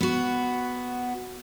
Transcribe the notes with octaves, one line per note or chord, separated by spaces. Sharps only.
B3 F#4